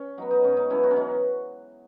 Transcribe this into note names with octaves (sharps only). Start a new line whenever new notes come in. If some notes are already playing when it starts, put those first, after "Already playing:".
Already playing: C#4
F#3 B3 D#4
D#4
G#2 C#4
D#4
F#3 B3 C#4 E4
D#4 F#4
C#4
B2 D#4